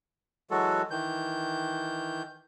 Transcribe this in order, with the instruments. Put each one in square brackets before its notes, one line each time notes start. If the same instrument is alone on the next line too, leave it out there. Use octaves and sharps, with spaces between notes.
[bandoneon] E3 F#3 G#3 F#4 A4
D#3 E3 G6